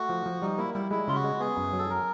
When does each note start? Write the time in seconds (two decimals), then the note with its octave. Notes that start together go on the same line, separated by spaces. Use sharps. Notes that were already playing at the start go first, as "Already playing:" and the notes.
Already playing: A3 F#4
0.09 F3
0.26 F3
0.42 G3 D#4
0.58 A#3 E4
0.74 G3 E4
0.91 G#3 E4
1.08 C#3 F4
1.15 F#4
1.24 G#3
1.40 B3 G#4
1.57 F#2
1.73 F#3
1.79 A4
1.90 F#3 A#4